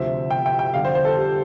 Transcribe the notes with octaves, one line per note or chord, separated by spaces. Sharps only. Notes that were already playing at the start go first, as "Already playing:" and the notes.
Already playing: D2 C3 F3 C4 E5
G5
G5
G5
F2 D3 G3 F5
C5
C5
A4
G4